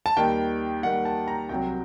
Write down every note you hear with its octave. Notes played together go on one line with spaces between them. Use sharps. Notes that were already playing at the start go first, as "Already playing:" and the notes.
A5
D#2 D#3 G3 G5
D#2 D#3 G3 F#5
A5
A#5
C2 C3 F#3 G5